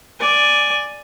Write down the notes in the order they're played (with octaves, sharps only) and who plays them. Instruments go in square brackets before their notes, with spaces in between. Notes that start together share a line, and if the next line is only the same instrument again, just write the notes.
[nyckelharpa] D5 G#5